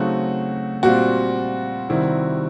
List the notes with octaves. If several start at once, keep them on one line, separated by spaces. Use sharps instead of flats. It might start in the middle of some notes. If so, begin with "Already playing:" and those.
Already playing: C#3 F#3 A3 C4 D#4 F#4
A#2 G3 C4 F4 F#4
C3 D#3 G3 C4 E4